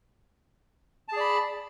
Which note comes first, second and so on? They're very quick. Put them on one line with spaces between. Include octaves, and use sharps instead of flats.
A5 G#4 D5 B5